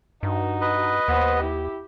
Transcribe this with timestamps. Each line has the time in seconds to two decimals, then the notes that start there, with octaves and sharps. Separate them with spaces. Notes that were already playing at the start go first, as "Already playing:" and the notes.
0.23 G2 D#4 F#4
0.61 B4 D#5
1.08 D#2 B3 C5
1.41 E4 G4